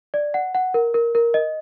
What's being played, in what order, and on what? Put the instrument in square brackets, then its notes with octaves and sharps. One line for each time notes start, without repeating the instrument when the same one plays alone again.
[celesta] D5
F#5
F#5
A#4
A#4
A#4
D#5